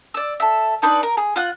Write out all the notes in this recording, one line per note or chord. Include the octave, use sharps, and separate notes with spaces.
D5 E6
A4 E5
D4 D#4 B4 D5
A#4
G#4
F4 F#5 F#6